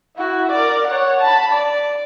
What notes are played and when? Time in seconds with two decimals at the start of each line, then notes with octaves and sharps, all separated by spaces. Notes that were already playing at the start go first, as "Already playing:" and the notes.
0.17 E4 F#4
0.51 A#4 D5
0.87 C#5 F#5
1.21 A5 B5
1.52 D5